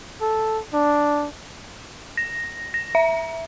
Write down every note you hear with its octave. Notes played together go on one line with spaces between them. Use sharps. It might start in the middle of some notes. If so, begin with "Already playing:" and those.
A4
D4
A#6
A#6
E5